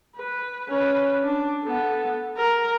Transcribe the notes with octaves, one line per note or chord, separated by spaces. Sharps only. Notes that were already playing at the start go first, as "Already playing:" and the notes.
B4
C#4 B4
D4
B3 A4
A#4